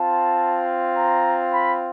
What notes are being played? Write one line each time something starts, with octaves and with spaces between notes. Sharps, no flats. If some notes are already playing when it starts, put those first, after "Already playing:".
Already playing: C4 F4 A5
A#5
B5